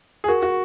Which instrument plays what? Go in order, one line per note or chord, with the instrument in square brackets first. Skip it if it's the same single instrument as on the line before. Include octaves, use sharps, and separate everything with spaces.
[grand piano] G#4
[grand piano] F#4 [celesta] A#4
[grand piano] F#4